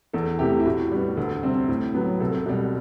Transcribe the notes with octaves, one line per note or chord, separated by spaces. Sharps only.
E2 A4
C3 E3 A3 G4
E4
A2 F#4
G3 B3
D2 A4
C3 G3 C4
A2
F#3 B3
C2 A4
B2 G3